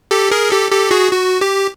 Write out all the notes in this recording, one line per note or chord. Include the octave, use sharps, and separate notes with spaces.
G4 A4
G#4 A#4
G4 A4
G4 A4
F#4 G#4
F#4
G4